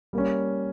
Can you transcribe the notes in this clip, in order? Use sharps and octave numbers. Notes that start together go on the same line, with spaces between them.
G3 A#3 C#4